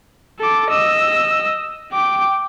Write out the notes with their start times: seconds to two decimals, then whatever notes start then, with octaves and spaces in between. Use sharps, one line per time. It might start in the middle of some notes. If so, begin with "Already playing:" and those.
0.39 A4 D6
0.71 D#5 E6
1.93 G5 D6